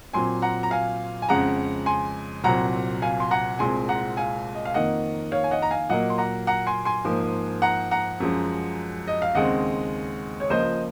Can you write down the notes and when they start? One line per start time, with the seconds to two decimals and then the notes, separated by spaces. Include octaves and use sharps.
0.13 A#2 F#3 C4 G#5 C6
0.42 F#5 A#5
0.63 A#5
0.71 F5 G#5
1.22 G#5
1.29 F2 C#3 G#3 F#5 A#5
1.86 G#5 C6
2.44 C2 A#2 F#3 C4 F#5 A#5
3.02 F5 G#5
3.20 C6
3.31 F#5 A#5
3.59 C2 A#2 G#3 C4 G#5 C6
3.89 F#5 A#5
4.17 F5 G#5
4.55 D#5
4.65 F5
4.74 F2 D#3 A#3 D#5 F#5
5.32 C#5 F5
5.44 G#5
5.51 D#5 F#5
5.62 A#5
5.71 F5 G#5
5.89 A#2 F#3 A#3 D#5 F#5
6.10 C6
6.18 F#5 A#5
6.47 F#5 A#5
6.67 G#5 C6
6.85 G#5 C6
7.04 G#2 F3 A#3
7.62 F#5 A#5
7.91 F#5 A#5
8.20 F#2 F3 G#3
9.08 D#5
9.22 F5
9.35 D#2 C#3 G#3 C4 D#5 F#5
10.40 C#5
10.50 C#2 C#3 F3 A#3 C5 D#5